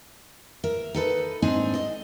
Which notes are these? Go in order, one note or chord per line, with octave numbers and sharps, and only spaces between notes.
A#4 E5
D#4 A4 B4
G#2 C4 D4 D#4 G#5
D#5